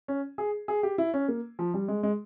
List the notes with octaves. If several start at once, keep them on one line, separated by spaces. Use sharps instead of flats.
C#4
G#4
G#4
G4
E4
C#4
A#3
F3
G3
G#3
G#3